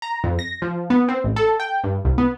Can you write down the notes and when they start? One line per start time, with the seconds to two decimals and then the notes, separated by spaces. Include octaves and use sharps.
0.02 A#5
0.24 F2
0.39 A#6
0.62 F3
0.90 B3
1.09 C4
1.24 A1
1.36 A4
1.60 G5
1.84 G2
2.05 C2
2.18 B3